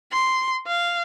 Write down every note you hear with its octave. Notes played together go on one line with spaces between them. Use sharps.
C6
F5